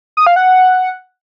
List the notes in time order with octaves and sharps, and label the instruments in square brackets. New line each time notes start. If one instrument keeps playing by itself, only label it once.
[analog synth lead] D#6
F5
F#5